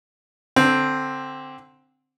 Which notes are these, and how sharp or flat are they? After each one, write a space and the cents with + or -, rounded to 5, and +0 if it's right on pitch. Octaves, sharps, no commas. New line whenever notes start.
D3 +0 C4 +0